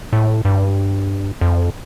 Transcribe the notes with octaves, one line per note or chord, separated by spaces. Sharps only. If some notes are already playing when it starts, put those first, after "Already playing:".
A2
G2
F2